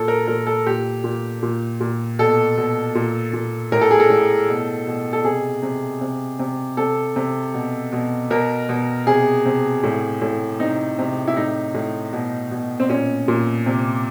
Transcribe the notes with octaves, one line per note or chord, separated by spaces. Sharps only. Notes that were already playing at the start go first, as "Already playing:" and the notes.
Already playing: A#2 A4
A#4
A#2 A#4
A4
A#2 G4
A#2
A#2
A#2
B2 A4
B2
A#2
A#2
A2 A#4
A4
G#4
A4
A2
B2
B2
A4
C3 G#4
C3
C3
C3
C3 A4
C3
B2
B2
B2 A#4
B2
C3 G#4
C3
A2
A2
C3 D#4
C3
E4
A2 D#4
A2
B2
B2
C4
A#2 C#4
A#2
C3